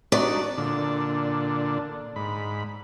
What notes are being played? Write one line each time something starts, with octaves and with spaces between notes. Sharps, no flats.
D4 D#4 F#4 D5
A#2 D3 D4
G#2 B5